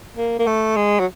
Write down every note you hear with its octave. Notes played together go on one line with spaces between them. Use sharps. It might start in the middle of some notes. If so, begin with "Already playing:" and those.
A#3
A#3
A3
G#3
F#3